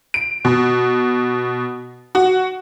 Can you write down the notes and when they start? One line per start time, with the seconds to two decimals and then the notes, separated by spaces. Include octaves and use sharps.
0.14 D7
0.45 B2
2.15 F#4